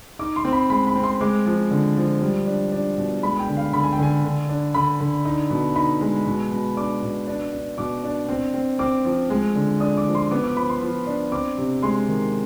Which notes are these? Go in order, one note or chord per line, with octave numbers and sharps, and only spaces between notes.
D#4 D6
C6
C4
B5
G#3 B5
B5
C4
C6
G#3 D6
F3
D3
F3
G3
D4
D4
B2
G#3 B5
G5
D3
F5
D3 B5
G#5
G5
D3 G#5
D3
D4
D3 B5
D3
D#4
B2
D#4 B5
G#3
B2
B2
D4 D6
B2
D4
D4
B2 D6
D4
C4
C4
C4 D6
F3
G#3
D3
D4 D#6
D6
F3
C6
B3 D6
D6
F3 B5
C6
F3
D4
C4 D6
C3
G#3 C6
D#3